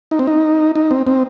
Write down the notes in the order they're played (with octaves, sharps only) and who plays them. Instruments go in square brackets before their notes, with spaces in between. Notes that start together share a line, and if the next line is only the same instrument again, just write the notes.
[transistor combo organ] D#4
C4
D#4
D#4
C4
C4